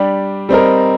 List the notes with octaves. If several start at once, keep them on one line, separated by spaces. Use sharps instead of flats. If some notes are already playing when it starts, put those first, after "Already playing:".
Already playing: G3 D4 G4
G3 C4 D#4 A#4